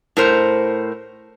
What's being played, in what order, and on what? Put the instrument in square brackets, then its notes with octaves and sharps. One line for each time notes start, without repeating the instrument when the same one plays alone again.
[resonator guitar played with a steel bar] A2 A#4 C5